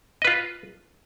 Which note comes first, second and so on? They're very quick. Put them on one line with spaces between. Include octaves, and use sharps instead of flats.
D#5 B4 F4